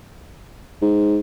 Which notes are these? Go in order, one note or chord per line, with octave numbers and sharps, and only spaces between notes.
G#2